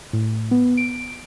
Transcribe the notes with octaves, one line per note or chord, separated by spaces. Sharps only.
A2
B3
D7